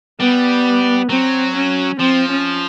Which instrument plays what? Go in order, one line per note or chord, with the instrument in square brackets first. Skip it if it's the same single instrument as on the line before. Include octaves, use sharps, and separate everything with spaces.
[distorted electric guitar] G3 [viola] B3
[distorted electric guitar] F#3 [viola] C4
[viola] C#4
[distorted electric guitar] F3 [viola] C4
[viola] C#4